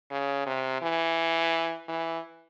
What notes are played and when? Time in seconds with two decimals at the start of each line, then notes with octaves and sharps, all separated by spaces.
0.11 C#3
0.46 C3
0.82 E3
1.88 E3